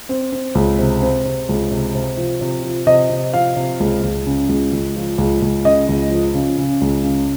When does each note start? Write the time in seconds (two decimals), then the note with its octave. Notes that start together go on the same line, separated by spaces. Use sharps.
0.09 C4
0.32 C4
0.55 C#2
0.79 C3
1.02 C4
1.25 C3
1.49 C#2
1.71 C3
1.95 C3
2.17 F3
2.41 C3
2.63 F3
2.87 C3 D#5
3.10 C3
3.34 F3 F5
3.56 C3
3.80 C#2
4.03 C#2
4.26 C#3
4.49 C#2
4.73 C#2
4.96 F3
5.18 C#2
5.42 C#2
5.65 C#3 D#5
5.89 C#2
6.11 F3
6.35 C#3
6.58 C#3
6.81 C#2
7.04 C#3